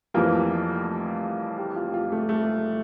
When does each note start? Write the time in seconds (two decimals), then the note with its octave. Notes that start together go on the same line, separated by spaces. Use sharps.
0.14 F1 F2 E3 G3 A#3 F4
1.58 G4
1.76 F4
1.94 F4
2.12 A3
2.29 A3